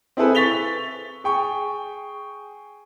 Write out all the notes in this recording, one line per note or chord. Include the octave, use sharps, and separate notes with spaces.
C4 E4 G#4 A4 B4
C#6 A6 B6 F7 G7
G#4 G5 C#6